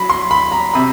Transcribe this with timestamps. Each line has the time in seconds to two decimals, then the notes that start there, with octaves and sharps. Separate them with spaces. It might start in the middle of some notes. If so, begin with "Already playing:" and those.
Already playing: F#3 B5
0.10 C6
0.31 B5
0.52 A#5
0.74 C3 B5